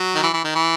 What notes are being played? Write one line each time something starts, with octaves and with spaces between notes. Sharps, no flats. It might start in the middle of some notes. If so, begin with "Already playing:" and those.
Already playing: F#3
D#3
E3
E3
D#3
E3